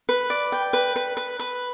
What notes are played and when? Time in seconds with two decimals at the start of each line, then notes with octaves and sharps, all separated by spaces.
0.09 B4
0.30 D5
0.52 G5
0.73 B4
0.96 B4
1.17 B4
1.39 B4